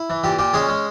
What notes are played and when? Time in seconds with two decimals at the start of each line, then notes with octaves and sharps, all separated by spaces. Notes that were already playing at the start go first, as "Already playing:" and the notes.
Already playing: E4
0.10 E3
0.24 A#2 G4
0.39 A#2 G4
0.53 G#3 C#4 G#4
0.69 G#3